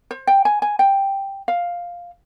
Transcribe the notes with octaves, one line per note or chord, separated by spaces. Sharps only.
C5
G5
G#5
G#5
G5
F5